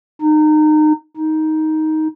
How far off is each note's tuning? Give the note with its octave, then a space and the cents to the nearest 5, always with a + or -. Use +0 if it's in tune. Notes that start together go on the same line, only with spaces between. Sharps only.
D#4 -25
D#4 +10